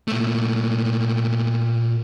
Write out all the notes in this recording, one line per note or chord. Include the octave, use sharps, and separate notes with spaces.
A#2 A3